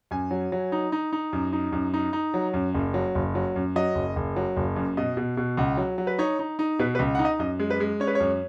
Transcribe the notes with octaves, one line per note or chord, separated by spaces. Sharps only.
F#2 G#5
F#3
F#3
D#4
D#4
D#4
F#2
D#4
F#2
D#4
D#4
F#3
F#2
F#1
F#3
F#1
F#3
F#2
F#3 D#5
F#1
F#1
F#3
F#1
F#2
B2 D#5
B2
B2
C#2 F#5
F#3
F#3
B4
D#4 C#5
D#4
D#4
B2 B4
B4
C#2
D#4 F#5
D#5
F#2 D#5
G#3
B4
G#3
C#4 C#5
B4
C#5
F#2